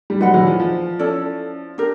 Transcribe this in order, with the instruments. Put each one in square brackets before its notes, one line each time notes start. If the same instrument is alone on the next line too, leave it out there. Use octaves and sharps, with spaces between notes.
[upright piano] G3
[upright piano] F#3 G#3 [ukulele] B4 D5 F#5 B5
[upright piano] E3 F#3
F3
F3
[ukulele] C#4 E4 A4 D5
D4 G4 A#4